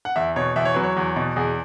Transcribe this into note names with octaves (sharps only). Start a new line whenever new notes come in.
F#5
E2 E5
B2 C#5
E2 E5
C#5
F#3 B4
C#5
E2
B2
E2 G#4